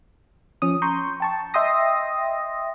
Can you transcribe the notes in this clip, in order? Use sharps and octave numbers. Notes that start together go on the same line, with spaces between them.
F3 C#4 D#6
A#5 C6 C#6 G6
G5 A5 C#6
D#5 E5 G5 C6 D#6 A#6